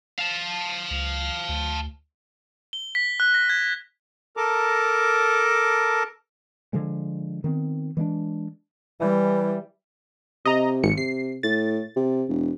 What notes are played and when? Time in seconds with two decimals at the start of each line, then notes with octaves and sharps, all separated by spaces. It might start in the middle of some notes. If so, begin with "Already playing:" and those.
0.19 F5 A5
0.91 C#2
1.49 D2
2.73 G7
2.95 B6
3.20 F#6
3.34 A#6
3.50 G#6
4.37 A4 A#4 A5 A#5 D6
6.73 D3 F3 G#3
7.44 D#3 B3 C4
7.97 E3 G#3 A#3 D4
9.00 E3 G3
10.45 C3 D#5 A#5
10.83 G#1 C#7
10.98 C3 C7
11.43 A2 A6
11.96 C3
12.29 E1